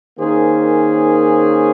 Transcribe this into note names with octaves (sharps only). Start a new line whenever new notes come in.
D#3 A#3 C#4 G#4 C5